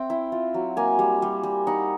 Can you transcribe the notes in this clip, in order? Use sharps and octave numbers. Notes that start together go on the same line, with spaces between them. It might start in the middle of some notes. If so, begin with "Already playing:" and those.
Already playing: C4 E5 G5
E4
F4
F#3
A#3 G#5
G3
G3
G3
D#4 F#5